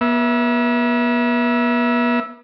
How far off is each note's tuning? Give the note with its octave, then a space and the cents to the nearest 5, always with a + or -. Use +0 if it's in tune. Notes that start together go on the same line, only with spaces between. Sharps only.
B3 -40 E5 +0